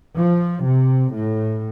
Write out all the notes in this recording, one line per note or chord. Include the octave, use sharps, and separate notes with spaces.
F3
C3
A2